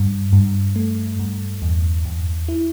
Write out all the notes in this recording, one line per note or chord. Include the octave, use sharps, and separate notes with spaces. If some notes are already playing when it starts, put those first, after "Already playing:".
Already playing: G2
G2
A3
G2
E2
E2
E4